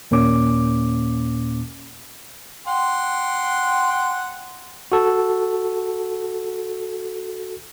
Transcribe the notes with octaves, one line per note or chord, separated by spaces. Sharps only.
D#2 A#2 A#3 C#4 D6
F#5 G5 C6
F#4 A4